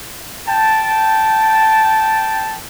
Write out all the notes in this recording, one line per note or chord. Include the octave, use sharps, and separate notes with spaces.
G5 A5